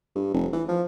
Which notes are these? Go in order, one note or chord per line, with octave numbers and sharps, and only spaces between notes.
G2
F1
E3
F3